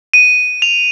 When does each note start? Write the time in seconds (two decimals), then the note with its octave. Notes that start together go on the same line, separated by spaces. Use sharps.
0.14 D#7
0.62 F7